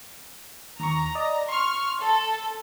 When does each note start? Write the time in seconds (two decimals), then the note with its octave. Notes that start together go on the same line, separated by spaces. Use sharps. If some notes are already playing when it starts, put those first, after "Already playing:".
0.80 D#2 A#5 C#6
1.15 D5 D#5
1.49 C6 C#6 F6
2.01 A4